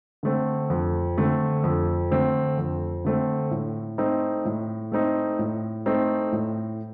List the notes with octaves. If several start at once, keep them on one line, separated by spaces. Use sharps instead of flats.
D3 A3 C4
F2
D3 A3 C4
F2
D3 A3 C4
F2
D3 A3 C4
A2
A3 C4 D#4
A2
A3 C4 D#4
A2
A3 C4 D#4
A2